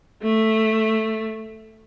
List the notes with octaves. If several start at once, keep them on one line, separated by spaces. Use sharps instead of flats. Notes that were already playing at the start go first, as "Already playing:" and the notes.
A3